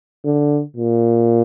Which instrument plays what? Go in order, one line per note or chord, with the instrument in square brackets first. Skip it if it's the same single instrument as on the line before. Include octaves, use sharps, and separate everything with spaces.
[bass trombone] D3
A#2